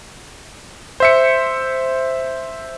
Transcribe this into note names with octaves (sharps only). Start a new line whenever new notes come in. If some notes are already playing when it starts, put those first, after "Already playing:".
C5 E5 C#7